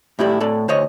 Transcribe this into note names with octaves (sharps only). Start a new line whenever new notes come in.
A2 E4 G4 D5
A2 A4 D5
D2 C5 C#5 D#5